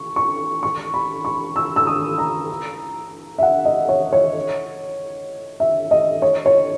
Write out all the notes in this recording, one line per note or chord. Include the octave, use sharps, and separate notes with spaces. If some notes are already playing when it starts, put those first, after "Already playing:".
Already playing: C#6
C#6
C#6
B5
C#6
E6
E6
D#6
A#5
E5
F#5
D#5
C#5
C#5
E5
D#5
C#5
C#5